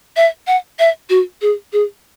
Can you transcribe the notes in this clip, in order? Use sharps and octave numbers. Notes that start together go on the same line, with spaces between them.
E5
F#5
E5
F#4
G#4
G#4